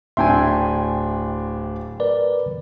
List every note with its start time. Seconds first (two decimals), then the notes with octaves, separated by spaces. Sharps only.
0.17 D1 A2 D4 E5 G5 G#5 C6
2.00 A#4 B4 D5